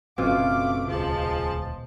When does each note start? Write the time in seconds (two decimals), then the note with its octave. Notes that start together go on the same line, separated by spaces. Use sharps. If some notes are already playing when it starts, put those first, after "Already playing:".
0.18 F#1 B2 A3 C4 C#4 F4 F5 D6
0.87 D#1 C#2 F3 G#3 A5